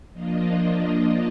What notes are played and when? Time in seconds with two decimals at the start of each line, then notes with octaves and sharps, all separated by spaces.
0.12 F3 A#3 D4 F4 D#5